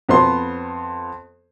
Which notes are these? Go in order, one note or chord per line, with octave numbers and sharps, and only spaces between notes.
F2 B3 C5 C6